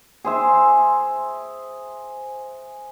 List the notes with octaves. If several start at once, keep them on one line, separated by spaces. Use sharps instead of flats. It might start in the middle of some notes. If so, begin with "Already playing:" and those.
G#4 C5 E5